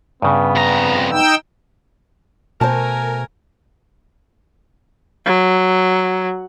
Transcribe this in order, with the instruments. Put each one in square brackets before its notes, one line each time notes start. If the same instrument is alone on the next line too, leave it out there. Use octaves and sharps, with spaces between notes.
[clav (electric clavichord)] G2 C#3 [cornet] B3
[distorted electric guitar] F2 A#5
[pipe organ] D#4 G5 E6
[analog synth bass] B2 [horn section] A3 A#4 G#5 [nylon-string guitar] C5 A5
[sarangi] F#3